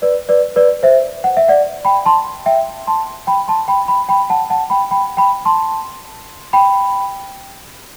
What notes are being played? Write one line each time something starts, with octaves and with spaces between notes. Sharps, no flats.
B4 D5
B4 D5
B4 D5
C5 E5
F#5
E5
D5 F#5
G5 B5
A5 C6
E5 G5
A5 C6
G5 B5
A5 C6
G5 B5
G5 B5
G5 B5
F#5 A5
F#5 A5
G5 B5
G5 B5
G5 B5
A5 C6
G5 B5